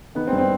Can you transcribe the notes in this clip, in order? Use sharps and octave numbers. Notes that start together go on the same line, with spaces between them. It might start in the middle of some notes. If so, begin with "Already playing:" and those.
D#3 B3
C4
G2
C4